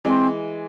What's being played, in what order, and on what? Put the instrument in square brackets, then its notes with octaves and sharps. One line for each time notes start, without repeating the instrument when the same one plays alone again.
[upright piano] E3 G#3 [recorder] C4